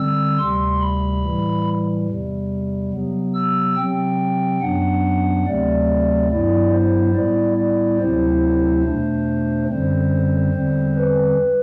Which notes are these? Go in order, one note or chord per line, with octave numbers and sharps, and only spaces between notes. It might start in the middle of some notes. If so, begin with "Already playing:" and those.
Already playing: D3 G3 C4 E6
D2 C3 G3 C6
B5
A2 E3 G3
E2 C3 G3
C3 F#3 B3
E6
C3 F#3 C4 G5
F#2 F#3 B3 D4 F#5
D2 C3 F#3 A3 C4 D5
G2 F#3 B3 E4 D5
C5
A2 G3 B3 E4 D5
D5
D2 C3 F#3 C4 E4 C5
E2 B2 A3 D4
F#2 D3 G3 C4 C5
E2 D3 G3 C4
B4